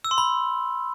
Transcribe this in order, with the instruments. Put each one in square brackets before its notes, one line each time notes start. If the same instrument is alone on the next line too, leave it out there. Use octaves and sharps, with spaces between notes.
[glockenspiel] E6
C6
B5